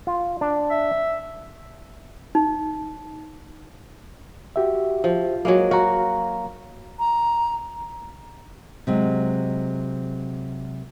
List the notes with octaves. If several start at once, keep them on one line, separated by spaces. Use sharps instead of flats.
F4
D4
E5
D#4
F#4 G4 E5
F3
F#3 G#3 A#3
F#4 F5 A#5
A#5
C3 F#3 G#3